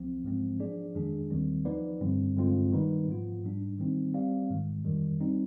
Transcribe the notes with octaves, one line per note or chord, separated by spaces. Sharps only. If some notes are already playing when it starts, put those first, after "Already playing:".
Already playing: C2 F3 C4
G#2 F3 G#3 C4
F3 B3 D4 G#4 D5
F2 D#3 G#3 D4 G#4
D#2 D#3 G3 C4
F3 B3 D#4 B4 D5
G2 D3 G3 C4
G2 D3 G#3 C4 F4
D#3 G3 B3 D#4 B4
G#2 F3 B3 F4
G#2 G3 D4
D#3 G3 C4 D#4
G3 C4 G4 D5 F5
G#2 D#3 G#3
F2 D#3 G3
G3 C4 D#4